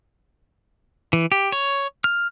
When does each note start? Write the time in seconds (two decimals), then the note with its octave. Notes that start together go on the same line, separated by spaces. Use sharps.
1.13 E3
1.32 G4
1.52 C#5
2.04 F6